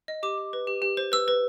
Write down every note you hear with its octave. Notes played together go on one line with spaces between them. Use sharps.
D#5
G4 D6
G4
B4
G4
G4
C5
B4 E6
B4